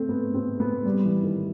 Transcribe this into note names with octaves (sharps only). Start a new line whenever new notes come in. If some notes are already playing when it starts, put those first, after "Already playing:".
Already playing: A3 C4
B3
C4
B3
G3
E3
D#3